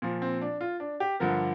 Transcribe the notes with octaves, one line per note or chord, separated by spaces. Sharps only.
A#2 F3
C4
D4
F4
D4
G4
G2 D3 F3 A#4